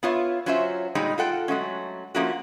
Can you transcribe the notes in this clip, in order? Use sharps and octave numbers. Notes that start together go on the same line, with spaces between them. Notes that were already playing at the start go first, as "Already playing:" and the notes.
B3 F4 C#5 E5
F#3 C#4 F4 C5 C#5 E5
A#2 G3 G#3 D#4 F#4
F4 A4 F#5 G5
F#3 G#3 A3 C#4
F3 A3 A#3 C#4 F4 F#4